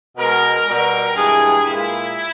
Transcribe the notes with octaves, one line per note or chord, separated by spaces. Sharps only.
B2 G#3 A#4
B2 G3 A#4
G2 E3 G#3 G#4
A#2 G#3 E4